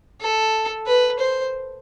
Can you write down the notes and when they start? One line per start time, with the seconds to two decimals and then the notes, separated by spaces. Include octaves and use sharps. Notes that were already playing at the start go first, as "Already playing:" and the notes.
0.21 A4
0.87 B4
1.19 C5